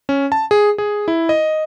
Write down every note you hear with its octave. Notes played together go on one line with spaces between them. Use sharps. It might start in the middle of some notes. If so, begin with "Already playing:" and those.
C#4
A5
G#4
G#4
E4
D#5